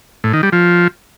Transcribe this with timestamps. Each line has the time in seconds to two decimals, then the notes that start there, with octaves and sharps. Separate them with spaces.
0.24 A2
0.33 D#3
0.43 G3
0.52 F3